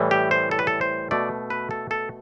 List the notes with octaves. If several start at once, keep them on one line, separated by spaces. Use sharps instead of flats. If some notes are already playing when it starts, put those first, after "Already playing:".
Already playing: A2 E3 G3
G4
C5
A4
B4
A4
C5
B2 A3 D5
B4
A4
A4